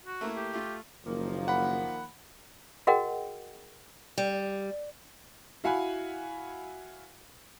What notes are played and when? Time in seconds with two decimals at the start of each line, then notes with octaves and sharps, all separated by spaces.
0.05 F#4
0.21 A3 A#3 E4
0.36 G4
0.53 A3 F4
1.06 F#1 D#3 F3 A#3
1.48 F#5 B5
2.87 F#4 G#4 A#4 D#5 F#5 G5
4.18 G3
5.64 E4 F#4 F5 F#5 G#5 B5